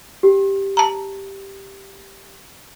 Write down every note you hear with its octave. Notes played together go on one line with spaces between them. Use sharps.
G4
A5 A#5